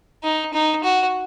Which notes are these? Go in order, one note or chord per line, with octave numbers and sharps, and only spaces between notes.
D#4
D#4
F#4